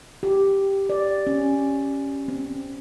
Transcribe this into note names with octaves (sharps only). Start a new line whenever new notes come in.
G4
D5
C#4
C4